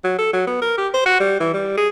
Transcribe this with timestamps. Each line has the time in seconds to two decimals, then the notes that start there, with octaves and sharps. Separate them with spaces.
0.04 F#3
0.19 A4
0.33 F#3
0.47 B3
0.62 A#4
0.78 G4
0.94 C5
1.06 F#4
1.20 G3
1.40 E3
1.54 G3
1.78 G#4